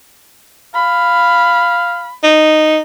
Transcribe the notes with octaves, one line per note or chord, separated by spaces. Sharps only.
F5 B5
D#4